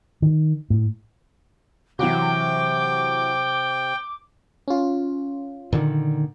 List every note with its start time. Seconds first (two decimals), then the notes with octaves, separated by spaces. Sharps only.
0.22 D#3
0.70 A2
1.99 C3 E3 F#3 F#4 G5 D6
4.68 C#4 F4
5.73 A#2 D3 D#3